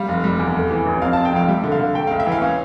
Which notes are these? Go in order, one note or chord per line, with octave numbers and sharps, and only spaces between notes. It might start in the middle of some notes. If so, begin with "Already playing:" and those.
Already playing: G3 F5
F1
G3
E2
A3
E3
A1
F2 F5
F1 A5
G5
F2 F5
G3 E5
D3
F5
D3
A3 G5
C#2 F5
E5
E3
F5
C#4